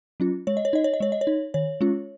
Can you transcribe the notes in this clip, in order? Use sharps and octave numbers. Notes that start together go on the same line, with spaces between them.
F#3 C#4 F4
G#3 C#5
D#5
C#5
D#4 D#5
C#5
D#5
G#3 C#5
D#5
C#5
D#4
D#3 C#5
G#3 C#4 F4